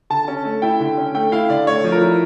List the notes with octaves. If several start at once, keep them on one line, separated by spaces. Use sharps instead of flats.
D3 A5
C#4
A3
E4 G5
D3
C#4
A3 G5
E4 F5
D3 D5
A3 C#5
F3
A#4
E4